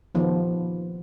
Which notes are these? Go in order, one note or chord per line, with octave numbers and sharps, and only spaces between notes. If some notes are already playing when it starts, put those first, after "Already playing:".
D#3 F3 B3